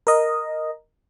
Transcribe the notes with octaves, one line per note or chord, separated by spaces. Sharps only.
A#4 D#5